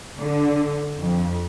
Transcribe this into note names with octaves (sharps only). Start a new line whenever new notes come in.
D3
F2